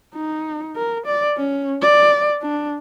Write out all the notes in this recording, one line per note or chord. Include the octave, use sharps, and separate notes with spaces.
D#4
A#4
D5
C#4
D5
D4